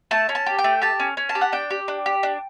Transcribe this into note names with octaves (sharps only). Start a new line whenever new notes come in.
A3 A5
C#4
A5
G4
G5
A3
G4 A5
C#4
C#4
A5
G4
F#5
D4 G5
G4
D4
G4
D4